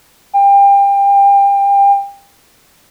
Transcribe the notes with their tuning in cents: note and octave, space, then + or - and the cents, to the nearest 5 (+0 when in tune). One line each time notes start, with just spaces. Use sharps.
G5 +30